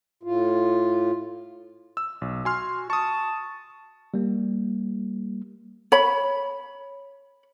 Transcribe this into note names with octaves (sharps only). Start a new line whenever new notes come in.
A2 F4
E6
B1
F#4 G#5 C6 F6
A5 C#6 D#6
G3 A#3
C#5 B5